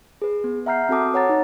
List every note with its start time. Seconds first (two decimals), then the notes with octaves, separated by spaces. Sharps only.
0.22 G#4 B4
0.44 B3
0.66 E5 F#5 A#5 F6 G6 C7
0.89 C4 F#4 A4 A5 D6 D#6
1.13 B4 C#5 F#5 A#5 A6
1.29 D#4